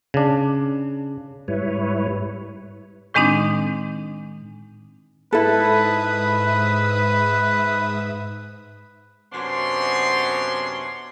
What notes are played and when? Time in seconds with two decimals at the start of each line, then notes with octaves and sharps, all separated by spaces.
0.14 C#3 D4
1.48 G#2 G3 E4 B4 C#5
3.14 A2 D#3 G#3 C4 D4 D#4
5.33 G#2 E4 A4 B4 E5 D#6
9.33 F#2 C3 B3 D4 C#5 C6